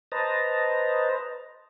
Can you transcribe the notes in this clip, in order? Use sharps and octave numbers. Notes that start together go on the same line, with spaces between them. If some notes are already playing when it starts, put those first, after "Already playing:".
B4 C5 D#5 A5 A#5